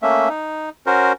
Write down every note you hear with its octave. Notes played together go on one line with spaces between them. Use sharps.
A3 A#3 C#4 E5
D#4
C#4 F#4 A#4 C5